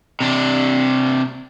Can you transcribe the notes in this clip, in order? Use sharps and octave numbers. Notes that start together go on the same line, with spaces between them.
C3 D4